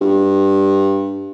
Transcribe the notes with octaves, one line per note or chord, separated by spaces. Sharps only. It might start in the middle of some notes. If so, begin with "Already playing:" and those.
G2